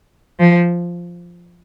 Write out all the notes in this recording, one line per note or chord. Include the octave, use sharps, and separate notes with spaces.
F3